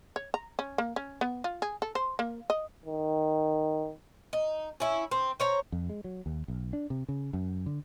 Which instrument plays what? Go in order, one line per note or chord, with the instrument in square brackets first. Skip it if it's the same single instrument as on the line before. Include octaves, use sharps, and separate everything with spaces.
[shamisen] C#5
A#5
C#4
A#3
C#4
B3
F4
G#4
A4
C5
A#3
D#5
[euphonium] D#3
[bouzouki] D#4
C#4 E4
C4
C5 C#5 A#5
[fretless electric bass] F2
G#3
F#3
D#2
B1
D4
C3
C#3
F#2
D3